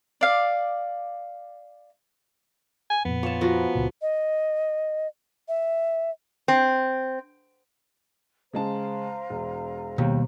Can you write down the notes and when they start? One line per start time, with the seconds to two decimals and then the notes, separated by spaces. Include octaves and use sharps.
0.21 D5 F5
2.90 G#5
3.05 F2 A#2 B3
3.23 F3 C#5 A5 D6
3.41 F3 F#4 A#4 B4
3.75 C#2 A#2
4.01 D#5
5.48 E5
6.48 C4
8.53 C#3 G#3 C5 F5 A5 A#5
9.30 E1
9.98 D#2 B2 G3 G4